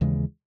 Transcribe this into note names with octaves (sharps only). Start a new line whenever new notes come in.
D#2 C#3 E3 G#3